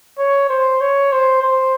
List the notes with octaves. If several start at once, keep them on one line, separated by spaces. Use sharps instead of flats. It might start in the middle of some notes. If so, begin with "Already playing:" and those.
C#5
C5
C#5
C5
C5